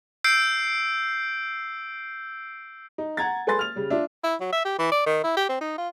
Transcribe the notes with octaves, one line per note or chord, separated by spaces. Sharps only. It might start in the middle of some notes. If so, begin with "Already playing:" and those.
E6 G6 C7 D7
D#4
F#5 A#5 G#6 A6
A4 B4 G#5 C6 A6
F6 F7
C#3 G3
D4 F4 E5
E4
F#3
E5
G4
E3
D5
D#3
E4
G4
C4
D#4
F4